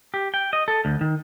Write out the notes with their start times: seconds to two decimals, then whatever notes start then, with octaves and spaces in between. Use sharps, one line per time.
0.14 G4
0.34 G5
0.53 D#5
0.68 A4
0.85 D2
1.01 D#3